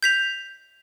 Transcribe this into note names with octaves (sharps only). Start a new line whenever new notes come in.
G6 B6 F7